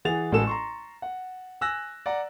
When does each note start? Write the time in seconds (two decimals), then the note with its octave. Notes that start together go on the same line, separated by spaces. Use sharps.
0.05 E3 G#4 F#5 A6 F7
0.32 A1 G#3 F#4 A4 E7
0.47 A#5 C6 C#6
1.02 F#5
1.61 G#5 E6 F#6 A#6
2.06 D5 F#5 A#5